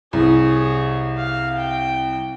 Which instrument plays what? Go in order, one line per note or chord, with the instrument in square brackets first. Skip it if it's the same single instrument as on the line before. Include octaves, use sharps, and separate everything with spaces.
[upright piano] C2 [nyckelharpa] G#4 C#5
[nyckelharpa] F5
G5